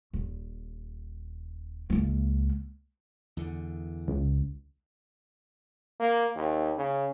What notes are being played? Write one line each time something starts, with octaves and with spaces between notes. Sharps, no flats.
D#1
C#2 A#3
E2 D3
C#2
A#3
D#2
C#3